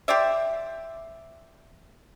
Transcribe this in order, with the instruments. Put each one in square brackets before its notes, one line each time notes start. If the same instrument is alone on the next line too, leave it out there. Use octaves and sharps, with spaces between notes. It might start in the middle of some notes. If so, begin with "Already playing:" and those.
[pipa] G4 C5 D5 E5